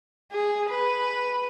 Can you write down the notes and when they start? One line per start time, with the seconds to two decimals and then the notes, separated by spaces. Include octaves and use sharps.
0.32 G#4
0.69 B4